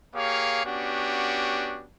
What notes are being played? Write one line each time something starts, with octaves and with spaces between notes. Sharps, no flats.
A#3 G4 G#4 C#5 F5
B3 C#4 D4 F#4 G4